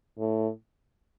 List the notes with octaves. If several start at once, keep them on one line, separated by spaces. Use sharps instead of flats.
A2